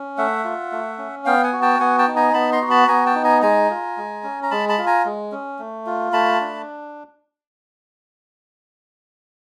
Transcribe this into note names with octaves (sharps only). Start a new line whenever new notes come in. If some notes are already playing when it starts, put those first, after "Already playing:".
Already playing: C#4
A3 E5 F#5
F4
A3
C#4
B3 F5 G5
F#5 G#5
F#4
G5 A5
B3 F#5 G#5
G5 A5
D#4
G#5 A#5
B3 A5 B5
A#5 C6
F#4
A5 B5
B3 G#5 A#5
G5 A5
D#4
G#5 A#5
G#3 G#5 A#5
F4
G#3
C#4
A#5
G#3 A5 B5
A5 B5
F4
G#5 A#5
G#3
C#4
A3
F4
A3 A5 B5
D4